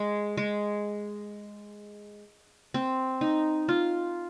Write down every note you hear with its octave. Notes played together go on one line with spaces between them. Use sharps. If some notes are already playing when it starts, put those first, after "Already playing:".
Already playing: G#3
G#3
C4
D#4
F4